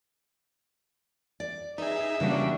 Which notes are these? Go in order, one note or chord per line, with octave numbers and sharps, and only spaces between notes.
D5
D#4 G#4 B4 E5
C#3 E3 G3 A#3 D4 F#4